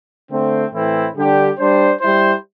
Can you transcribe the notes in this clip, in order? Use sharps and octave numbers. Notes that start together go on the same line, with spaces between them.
D3 A3 C4
A2 E3 A3 C4 E4
D3 G3 D4 G4
G3 D4 C5
G3 E4 C5